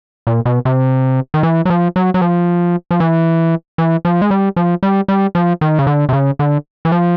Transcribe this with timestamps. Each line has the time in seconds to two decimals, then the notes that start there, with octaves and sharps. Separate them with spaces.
0.27 A#2
0.45 B2
0.65 C3
1.34 D#3
1.43 E3
1.65 F#3
1.70 F3
1.96 F#3
2.14 F#3
2.21 F3
2.91 F3
3.00 E3
3.78 E3
4.05 F3
4.21 G#3
4.31 G3
4.56 F3
4.83 G3
5.08 G3
5.35 F3
5.61 D#3
5.79 C#3
5.87 D3
6.09 C3
6.13 C#3
6.39 D3
6.85 E3
6.92 F3